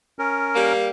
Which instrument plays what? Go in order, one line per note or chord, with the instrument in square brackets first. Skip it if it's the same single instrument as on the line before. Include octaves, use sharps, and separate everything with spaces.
[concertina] C#4 A#4
[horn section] G3 A#3